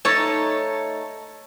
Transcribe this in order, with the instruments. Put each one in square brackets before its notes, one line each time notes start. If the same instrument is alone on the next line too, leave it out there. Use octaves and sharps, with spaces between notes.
[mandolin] A3 D#4 A5 [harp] C#5